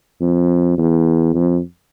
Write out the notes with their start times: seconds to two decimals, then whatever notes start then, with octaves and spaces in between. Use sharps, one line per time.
0.21 F2
0.78 E2
1.34 F2